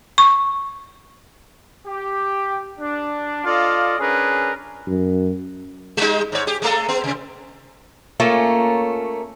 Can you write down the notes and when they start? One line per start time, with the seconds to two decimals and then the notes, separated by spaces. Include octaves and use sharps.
0.18 C#6
1.87 G4
2.79 D4
3.45 F4 A4 D5 D#5 F5
3.99 C#4 D4 G#4 A#4 B4
4.87 F#2
5.97 G3 G#3 D#4
6.32 G#2 C#5
6.47 G4 G#4
6.62 G#3 A3 A4
6.89 B3
7.04 C3
8.20 A3 A#3 C#4 F4